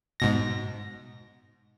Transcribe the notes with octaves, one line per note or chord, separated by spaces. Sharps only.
G#2 B2 A#6